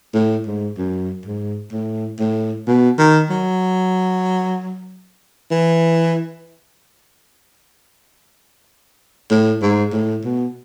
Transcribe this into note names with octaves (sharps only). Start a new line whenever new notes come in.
A2
G#2
F#2
G#2
A2
A2
B2
D#3
F#3
E3
A2
G#2
A2
B2